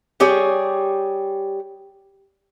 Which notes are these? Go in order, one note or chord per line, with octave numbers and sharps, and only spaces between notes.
G3 G4 G#4 C#5